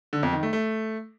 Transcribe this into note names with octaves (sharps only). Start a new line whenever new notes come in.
D3
F2
D#3
A3
A3